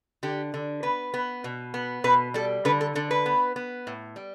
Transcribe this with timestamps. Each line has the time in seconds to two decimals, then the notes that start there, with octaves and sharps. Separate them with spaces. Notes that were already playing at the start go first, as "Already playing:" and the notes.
0.23 D3 G4
0.54 D3
0.83 B3 B4
1.14 B3
1.44 B2
1.74 B3
2.04 B2 B4
2.34 G3 A4
2.65 D3 B4
2.81 A4
2.95 D3 A4
3.11 B4
3.26 B3
3.56 B3
3.87 A2
4.16 G3